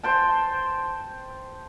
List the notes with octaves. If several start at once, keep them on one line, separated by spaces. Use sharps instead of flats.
C5 G5 A5